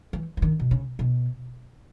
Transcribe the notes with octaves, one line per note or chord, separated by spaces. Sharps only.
E3
E3
D#3
B2
C#3
B2